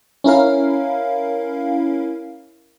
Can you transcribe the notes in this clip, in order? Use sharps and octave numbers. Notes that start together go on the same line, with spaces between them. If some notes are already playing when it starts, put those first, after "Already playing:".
C#4 E4 A#4 F5